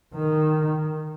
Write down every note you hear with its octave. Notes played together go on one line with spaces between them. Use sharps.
D#3